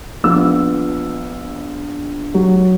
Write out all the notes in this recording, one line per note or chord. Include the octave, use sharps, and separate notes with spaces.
A#1 B3 F4 E6
F#3